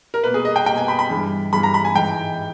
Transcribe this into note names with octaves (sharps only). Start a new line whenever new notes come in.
A#4
B2 A#3 B4
G#4
D#5
G5
B2 A#3 G5
G#5
B5
B5
G2 E3 G#3
G2 E3 G#3 B5
A#5
B5
G#5
G#2 E3 G#3 G5